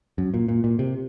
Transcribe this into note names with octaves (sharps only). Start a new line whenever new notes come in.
F#2
A#2
A#2
A#2
C3